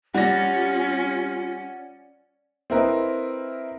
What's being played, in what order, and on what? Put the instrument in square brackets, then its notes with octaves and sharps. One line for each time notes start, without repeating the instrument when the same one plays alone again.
[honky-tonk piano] G3 A#6 [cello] C#4 [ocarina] F4 [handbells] D5 F#5
[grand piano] C4 E4 A#4 B4 D#5